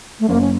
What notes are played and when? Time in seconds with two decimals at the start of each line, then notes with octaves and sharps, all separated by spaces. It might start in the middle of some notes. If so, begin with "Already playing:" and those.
0.20 A3
0.29 F#1 A#3
0.41 C#4